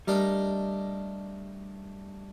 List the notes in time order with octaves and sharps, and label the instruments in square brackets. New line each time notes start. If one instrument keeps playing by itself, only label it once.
[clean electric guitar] G3 [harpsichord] A3 D4 G4 A#4 D#5